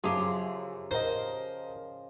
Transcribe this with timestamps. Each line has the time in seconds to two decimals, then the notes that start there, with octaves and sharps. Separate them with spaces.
0.04 F#2 C#3 F3 G4 G#4
0.91 A#4 C5 D#5